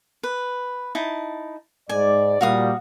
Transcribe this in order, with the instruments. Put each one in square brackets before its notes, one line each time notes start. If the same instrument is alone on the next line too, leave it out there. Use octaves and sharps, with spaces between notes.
[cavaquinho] B4
D#4 E4 A5
[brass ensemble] G#2 D5 [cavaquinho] G#5
[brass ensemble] A#2 G3 [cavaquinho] F#4 F5 D#6